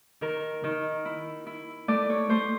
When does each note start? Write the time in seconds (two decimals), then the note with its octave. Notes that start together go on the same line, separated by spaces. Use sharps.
0.21 D#3 A#4
0.64 D#3
1.05 E4
1.46 E4
1.88 A3 D5
2.10 C#5
2.30 A3 C5